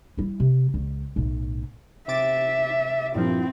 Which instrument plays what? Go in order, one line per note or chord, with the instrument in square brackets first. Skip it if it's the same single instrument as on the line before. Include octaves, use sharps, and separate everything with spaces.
[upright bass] G3 E4
C3
C#2
B1 A2
[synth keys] C3 D6 A6 [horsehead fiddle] E5
[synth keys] G2 A#2 F3 [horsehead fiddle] C4 E4